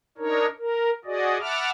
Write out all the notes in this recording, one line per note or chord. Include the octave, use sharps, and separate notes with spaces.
D4 D#4 A#4 C#5
A#4
F#4 G#4 D5 D#5
E5 F#5 A5 B5 D6 F6